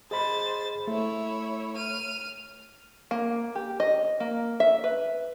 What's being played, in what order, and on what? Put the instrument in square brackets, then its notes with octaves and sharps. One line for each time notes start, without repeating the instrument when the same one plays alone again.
[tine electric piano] G#4 D#5 B5 [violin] C5 A6
[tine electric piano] A3 [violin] E4 C#5
[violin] F6 D#7
[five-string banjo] A#3
G4
D#5
A#3
E5
B4